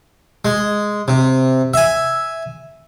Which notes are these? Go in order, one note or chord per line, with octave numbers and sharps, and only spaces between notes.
G#3
C3
E5 G#5